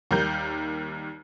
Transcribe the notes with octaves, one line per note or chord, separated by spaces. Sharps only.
D#2 D#3 G3 A#4 G6